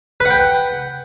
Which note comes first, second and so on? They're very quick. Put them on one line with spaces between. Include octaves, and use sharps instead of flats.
B4 F#5 G5